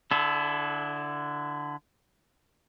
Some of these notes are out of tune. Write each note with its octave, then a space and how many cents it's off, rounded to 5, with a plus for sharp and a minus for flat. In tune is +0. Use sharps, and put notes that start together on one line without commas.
D3 +0 E4 +10 A4 -40